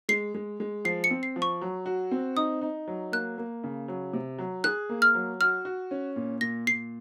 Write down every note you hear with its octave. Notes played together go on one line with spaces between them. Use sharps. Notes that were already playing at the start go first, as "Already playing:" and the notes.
G#3 C7
G#3
G#3
F3 C7
C#7
C4
C7
F3
C#6
F#3
F#4
C4
D#4 D#6
D#4
F#3
A#3 F#6
A#3
C#3
F#3
C3
F#3
G#4 F#6
A#3
F6
F#3
F#4 F6
F#4
C#4
A#2
A#2 A#6
A#2 C7